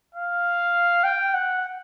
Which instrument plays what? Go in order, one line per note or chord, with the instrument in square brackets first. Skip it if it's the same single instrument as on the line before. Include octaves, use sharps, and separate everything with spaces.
[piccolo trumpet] F5
G5
F#5